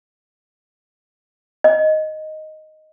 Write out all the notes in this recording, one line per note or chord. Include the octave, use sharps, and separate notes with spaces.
D#5